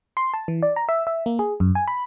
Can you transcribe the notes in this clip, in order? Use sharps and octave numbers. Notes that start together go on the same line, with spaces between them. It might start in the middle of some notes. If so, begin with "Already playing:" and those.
C6
A5
E3
D5
A#5
E5
E5
A#3
G#4
F#2
G#5
B5